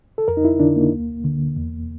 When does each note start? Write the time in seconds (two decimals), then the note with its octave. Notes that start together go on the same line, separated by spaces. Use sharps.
0.18 A4
0.28 F2 A#4
0.37 D#4
0.45 E4
0.60 D3 D4
0.76 A#3
0.92 D2
1.24 D3
1.56 E2